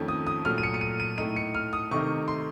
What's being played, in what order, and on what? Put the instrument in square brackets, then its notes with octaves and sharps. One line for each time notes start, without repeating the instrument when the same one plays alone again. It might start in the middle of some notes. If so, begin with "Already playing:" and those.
Already playing: [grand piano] F2 D#3 A3 C#4
D#6
D#6
A#2 F#3 A3 F6
D#7
C#7
C#7
D#7
D#7
A2 A3 D#4 D#7
C#7
F6
D#6
C3 D#3 A3 D#4 C#6
C6